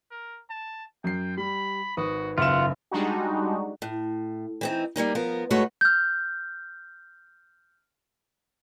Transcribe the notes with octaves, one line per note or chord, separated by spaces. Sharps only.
A#4
A5
F#2 G5 C7
G3 B5
G#1 F#4 B4 D#6
F#1 F4 E5 F#5 E7
G3 G#3 D4 D#4 F#4
A2
E3 C4 D#4
G3 A#3 C#4 D#4
F3 B3 A#4
G#2 G#3 A3 F#4 B4 C#5
F6 G6